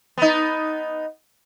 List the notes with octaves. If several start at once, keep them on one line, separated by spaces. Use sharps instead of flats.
B3 D#4